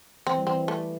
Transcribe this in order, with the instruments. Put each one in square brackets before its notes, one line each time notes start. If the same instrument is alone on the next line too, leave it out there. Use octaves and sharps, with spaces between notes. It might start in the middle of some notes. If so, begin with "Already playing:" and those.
[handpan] E3 [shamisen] C4
[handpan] G3
[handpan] E3 [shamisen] C4
[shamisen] A3